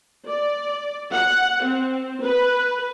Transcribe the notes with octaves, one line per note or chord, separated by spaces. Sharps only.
D5
F#5
C4
B4